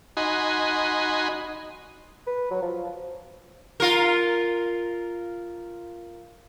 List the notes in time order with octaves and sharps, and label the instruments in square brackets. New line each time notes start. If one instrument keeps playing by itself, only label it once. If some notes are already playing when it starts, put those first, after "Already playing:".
[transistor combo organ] D#4 F#4 D#5 G#5 B5 C6
[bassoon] B4
F#3
F3
[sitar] F4 A#4